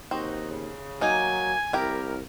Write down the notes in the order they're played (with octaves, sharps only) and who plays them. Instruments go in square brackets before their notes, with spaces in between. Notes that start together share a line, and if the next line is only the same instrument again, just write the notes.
[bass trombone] D#2 [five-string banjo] C4 [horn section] D#4 F#4
[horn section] C#3
[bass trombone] F#3 [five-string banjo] A#3 D#4 [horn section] G#5
[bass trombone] C2 [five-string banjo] E4 G4 [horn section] A#4